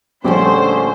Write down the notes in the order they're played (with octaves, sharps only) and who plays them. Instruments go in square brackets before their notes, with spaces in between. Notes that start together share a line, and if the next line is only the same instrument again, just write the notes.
[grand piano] A#1 [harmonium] D3 A3 C#4 [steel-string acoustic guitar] F3 G3 G4 [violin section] C5